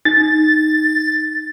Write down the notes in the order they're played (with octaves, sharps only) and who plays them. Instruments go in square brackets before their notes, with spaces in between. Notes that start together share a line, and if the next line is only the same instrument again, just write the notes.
[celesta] D#4 [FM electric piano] A6